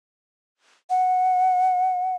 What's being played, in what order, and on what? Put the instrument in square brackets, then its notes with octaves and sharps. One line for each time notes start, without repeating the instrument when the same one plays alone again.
[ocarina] F#5